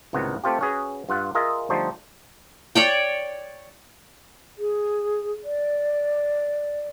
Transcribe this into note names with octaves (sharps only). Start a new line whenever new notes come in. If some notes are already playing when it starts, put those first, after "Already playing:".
C#2 A2 C3 D#3 B3 F#5
A3 C4 F4 G4
C#4 F#4 G#4 B4
G2 F4 F#5
F4 G#4 A#4 D#5 E5
D3 F3 G3 A3 D#4 C5
C#5 D5 G5
G#4
D5